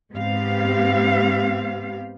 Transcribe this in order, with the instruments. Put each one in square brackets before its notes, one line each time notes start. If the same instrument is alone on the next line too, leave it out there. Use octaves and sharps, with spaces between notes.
[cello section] G#2 B3 C4 G4 F5